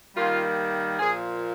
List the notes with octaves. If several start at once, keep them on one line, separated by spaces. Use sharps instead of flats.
D#3 G3 A#3 F4
A#2 F3 A#3 G#4